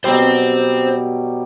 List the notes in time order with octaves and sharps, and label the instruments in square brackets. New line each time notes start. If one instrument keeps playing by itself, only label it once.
[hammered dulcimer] B2 F#3 G3 [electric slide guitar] C5 G5